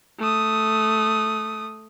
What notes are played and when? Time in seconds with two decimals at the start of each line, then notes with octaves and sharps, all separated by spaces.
0.19 A3 D#6